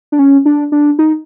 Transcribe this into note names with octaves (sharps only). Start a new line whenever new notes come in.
D4
C#4
D4
D4
D#4